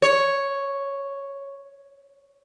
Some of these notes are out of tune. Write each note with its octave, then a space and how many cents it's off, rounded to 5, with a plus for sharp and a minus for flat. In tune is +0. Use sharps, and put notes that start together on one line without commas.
C#5 +0